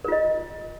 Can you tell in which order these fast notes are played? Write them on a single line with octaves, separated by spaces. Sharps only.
A#4 F4 D#5